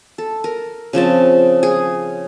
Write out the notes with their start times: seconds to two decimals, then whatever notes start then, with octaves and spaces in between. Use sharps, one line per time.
0.18 A4
0.44 A#4
0.93 C#3 F3 C4 A5
1.63 G#4